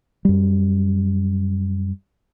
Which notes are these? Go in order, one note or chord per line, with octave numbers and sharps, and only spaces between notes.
F#2 G3